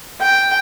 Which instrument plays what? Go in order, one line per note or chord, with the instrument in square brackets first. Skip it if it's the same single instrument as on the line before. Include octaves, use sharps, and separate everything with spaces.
[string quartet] G5